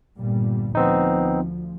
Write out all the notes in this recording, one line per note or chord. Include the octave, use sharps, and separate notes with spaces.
G1 A#2 G3
D2 F3 B3 C4 D#4